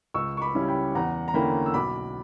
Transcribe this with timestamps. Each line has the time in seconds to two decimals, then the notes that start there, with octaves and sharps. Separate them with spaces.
0.14 C#2 C#6 E6
0.37 C#6
0.41 B5 D6
0.55 C#3 G3 C#4 E4
0.68 G5 B5
0.95 E2 F#5 A#5
1.28 A#5
1.34 D3 A#3 C#4 E4 G5 B5
1.66 E6
1.74 B1 B5 D6